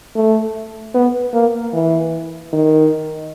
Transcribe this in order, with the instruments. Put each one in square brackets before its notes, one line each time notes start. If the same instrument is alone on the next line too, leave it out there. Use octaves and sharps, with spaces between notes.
[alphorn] A3
B3
A#3
E3
D#3